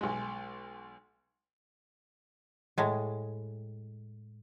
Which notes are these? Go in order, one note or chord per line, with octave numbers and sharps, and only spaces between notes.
B1 G#3
A2 G#3